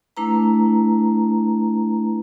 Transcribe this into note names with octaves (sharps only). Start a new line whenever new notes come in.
A3 D4 E4 B4 A#5